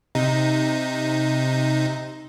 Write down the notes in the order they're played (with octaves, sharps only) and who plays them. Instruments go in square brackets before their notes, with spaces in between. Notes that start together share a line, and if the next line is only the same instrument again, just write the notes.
[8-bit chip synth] C3 D#4